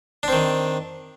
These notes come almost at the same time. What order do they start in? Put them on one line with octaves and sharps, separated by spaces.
D4 C4 D#3